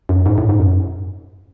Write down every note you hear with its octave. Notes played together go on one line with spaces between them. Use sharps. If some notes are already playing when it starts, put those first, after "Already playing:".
F#2
G#2
A2
G#2
F#2